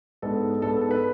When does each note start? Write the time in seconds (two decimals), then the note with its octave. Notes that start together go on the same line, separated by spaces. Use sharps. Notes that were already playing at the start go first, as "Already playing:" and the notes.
0.22 G#2 G#3 B3 D4 A4
0.62 G#2 G#3 B3 D4 A4
0.81 A4
0.91 B4